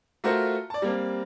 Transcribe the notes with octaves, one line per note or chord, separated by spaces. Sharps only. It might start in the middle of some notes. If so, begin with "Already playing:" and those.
A3 F4 F#4 A4 A#4 C5
D5 A5
G3 A#3 C4